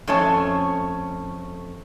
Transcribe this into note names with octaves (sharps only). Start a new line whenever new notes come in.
F2 A3 C#4 C#5 A5